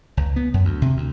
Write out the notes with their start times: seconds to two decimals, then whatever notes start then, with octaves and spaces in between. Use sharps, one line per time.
0.17 C#2
0.36 B3
0.54 F#2
0.65 D2
0.82 C3
0.97 D2